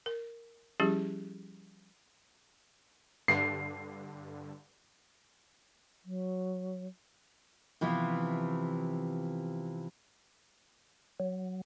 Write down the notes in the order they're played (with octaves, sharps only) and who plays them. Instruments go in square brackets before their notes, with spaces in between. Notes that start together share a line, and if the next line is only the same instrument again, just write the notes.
[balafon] A#4
F3 G3 C#4 E4 G4 G#4
[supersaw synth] G2 D3 [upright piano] C7
[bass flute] F#3
[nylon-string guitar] C3 E3 F3 B3
[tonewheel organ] F#3